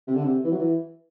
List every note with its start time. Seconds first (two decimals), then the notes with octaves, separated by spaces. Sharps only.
0.07 C3
0.15 D3
0.24 C3
0.44 E3
0.52 F#3
0.59 E3